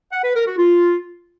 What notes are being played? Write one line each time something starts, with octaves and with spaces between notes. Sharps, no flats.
F#5
B4
A#4
F#4
F4